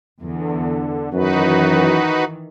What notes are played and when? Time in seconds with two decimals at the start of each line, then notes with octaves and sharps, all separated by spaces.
0.22 E2 D3
1.14 F#2 D#3 E3 D#4 F#4 B4